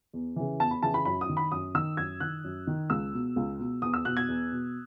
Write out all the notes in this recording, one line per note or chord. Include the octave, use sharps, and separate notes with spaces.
E2
C#3 E3
E2 A5
B5
C#3 E3 A5
B5
F#2 B5
D#6
D#3
B5
F#2 D#6
D#3 E6
F#2 G#6
D#3 F#6
F#2
D#3
C#2 E6
B2
C#2
B2
E2 D#6
E6
B2 F#6
G#6
E2
B2